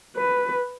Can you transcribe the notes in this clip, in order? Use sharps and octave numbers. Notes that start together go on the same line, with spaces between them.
B4